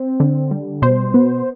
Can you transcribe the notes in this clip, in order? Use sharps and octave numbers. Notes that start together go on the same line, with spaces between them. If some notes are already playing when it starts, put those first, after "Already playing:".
Already playing: C4
D3
G3
B2 C5
B3